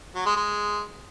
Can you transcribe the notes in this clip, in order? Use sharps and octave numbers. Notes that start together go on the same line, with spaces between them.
F#3
G#3
G#3